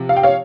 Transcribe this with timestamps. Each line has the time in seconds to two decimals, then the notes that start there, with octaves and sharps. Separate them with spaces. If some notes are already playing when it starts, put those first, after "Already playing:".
Already playing: C3 F3
0.09 F5
0.16 G5
0.23 C#5 F5